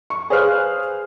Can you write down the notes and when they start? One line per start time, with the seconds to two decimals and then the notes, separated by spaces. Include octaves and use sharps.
0.10 C#6
0.30 G#4 B4 C5 F5 F6 F#6